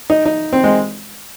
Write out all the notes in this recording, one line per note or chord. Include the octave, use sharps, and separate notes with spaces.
D#4
D#4
C4
G#3